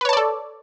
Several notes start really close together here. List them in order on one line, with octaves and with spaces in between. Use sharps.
B4 C#5 A5 D5 A4